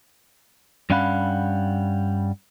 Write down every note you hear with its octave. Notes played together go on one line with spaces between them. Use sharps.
G2 G3 C#4 F5 F#5 B5